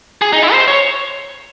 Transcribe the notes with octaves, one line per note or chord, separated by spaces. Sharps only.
G#4
D#4
E4
C5
C#5